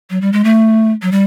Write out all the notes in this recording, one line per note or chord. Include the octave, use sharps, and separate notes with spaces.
F#3
G3
G#3
A3
F#3
G3